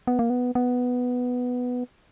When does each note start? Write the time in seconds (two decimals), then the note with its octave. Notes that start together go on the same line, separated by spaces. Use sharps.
0.07 B3
0.19 A#3
0.30 B3
0.55 B3